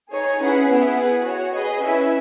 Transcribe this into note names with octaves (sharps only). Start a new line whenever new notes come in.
D#4 G#4 C#5 G#5
C#4 E4 G#4 B4 F#5
B3 E4 G#4
G#4 B4 F#5
F#4 C#5 F#5
G#4 B4 D#5 G#5
C#4 E4 B4 E5 G#5